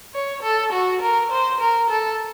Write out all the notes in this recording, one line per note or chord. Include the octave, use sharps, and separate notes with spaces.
C#5
A4
F#4
A#4
C5
A#4
A4